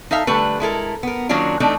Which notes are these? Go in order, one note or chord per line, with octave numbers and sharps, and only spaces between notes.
D#4 A4 E5 F5
D3 G3 A3 A4 B4
G#3 E4 A4 A#4
B3 A#4
D#3 F#3 A#3 C#4 D4 F4
E3 A3 C4 D4 D#4 A4